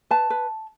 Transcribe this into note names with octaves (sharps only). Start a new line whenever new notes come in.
B4 A5
B4